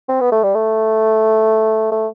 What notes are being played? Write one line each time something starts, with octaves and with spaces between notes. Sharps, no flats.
C4
B3
A3
G3
A3
A3